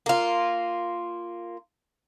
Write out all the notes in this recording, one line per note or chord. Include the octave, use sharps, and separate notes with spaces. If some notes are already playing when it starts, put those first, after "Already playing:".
A#3 F4